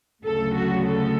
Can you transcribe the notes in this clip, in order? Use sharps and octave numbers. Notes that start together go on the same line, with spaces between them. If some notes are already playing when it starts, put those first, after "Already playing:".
D2 C#3 F#3 A3 A4
F#4
A4